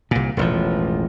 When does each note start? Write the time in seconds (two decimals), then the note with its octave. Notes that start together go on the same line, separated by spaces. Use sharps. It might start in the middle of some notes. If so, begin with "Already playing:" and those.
0.11 C2 A#2
0.37 E1 A1 F3